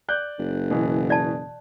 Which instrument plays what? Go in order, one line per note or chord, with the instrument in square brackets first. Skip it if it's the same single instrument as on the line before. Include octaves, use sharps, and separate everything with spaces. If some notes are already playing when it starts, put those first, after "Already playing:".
[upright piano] D5 F#6 G6
[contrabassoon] F#1
[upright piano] B2 E3
[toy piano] D5 A5